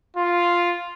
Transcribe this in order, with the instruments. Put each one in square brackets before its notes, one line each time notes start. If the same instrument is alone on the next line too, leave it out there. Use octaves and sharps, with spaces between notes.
[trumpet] F4